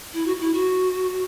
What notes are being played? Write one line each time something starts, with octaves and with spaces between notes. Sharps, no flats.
E4
F#4
F#4
E4
F#4